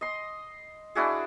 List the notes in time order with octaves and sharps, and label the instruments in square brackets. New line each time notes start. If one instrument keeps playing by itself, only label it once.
[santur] D#5 C6
D4 E4 F#4 G#4